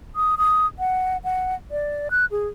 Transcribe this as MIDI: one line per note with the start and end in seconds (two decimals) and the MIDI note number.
0.16 0.35 87
0.38 0.66 87
0.79 1.17 78
1.24 1.55 78
1.71 2.08 74
2.11 2.25 90
2.31 2.48 68